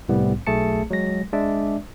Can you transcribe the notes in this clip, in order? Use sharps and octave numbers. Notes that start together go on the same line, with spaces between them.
C2 A2 G3 B3
B1 A3 G#4 A5 C#7
F#3 G#3 A#6
G#3 D4 D5 E5